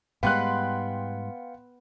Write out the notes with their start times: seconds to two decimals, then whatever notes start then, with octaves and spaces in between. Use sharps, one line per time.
0.23 G#2 G3 G#3 B3 F5 G5 C6 F#6